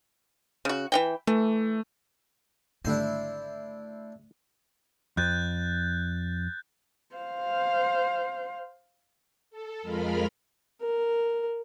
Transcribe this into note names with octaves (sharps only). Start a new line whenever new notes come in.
C#3 F#4
E3 F#5 G5
E3 A3
G#1 D3 G3 A3 D4 E4 C5
F2 F#6 G6 A6
C5 F5
A4
F2 G#3 F4 A#4 B5 F6
A#4